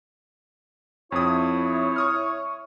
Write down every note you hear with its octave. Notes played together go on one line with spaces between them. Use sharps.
F2 C4 E4 C#5 D#6
C#6 D#6 F6